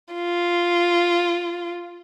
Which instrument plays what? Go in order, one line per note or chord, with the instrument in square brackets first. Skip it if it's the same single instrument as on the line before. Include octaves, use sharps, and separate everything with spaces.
[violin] F4